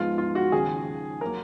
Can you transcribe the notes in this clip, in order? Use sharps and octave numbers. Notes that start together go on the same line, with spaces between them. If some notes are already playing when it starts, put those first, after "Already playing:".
Already playing: G#2 F3 G#3 B3 F4
F4
F#4
D#2 C#3 F3 G#4
F#3 A#3 A#4